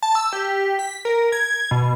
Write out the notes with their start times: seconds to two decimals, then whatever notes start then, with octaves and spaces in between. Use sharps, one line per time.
0.02 A5
0.15 E6
0.33 G4
0.79 B6
1.05 A#4
1.32 G#6
1.71 B2